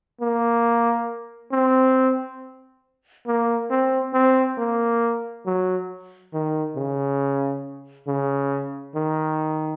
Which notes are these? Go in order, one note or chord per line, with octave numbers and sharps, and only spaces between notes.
A#3
C4
A#3
C4
C4
A#3
F#3
D#3
C#3
C#3
D#3